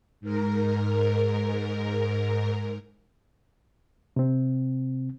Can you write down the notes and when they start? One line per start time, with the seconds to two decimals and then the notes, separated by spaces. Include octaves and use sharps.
0.21 G#2 A#4
4.16 C3 C4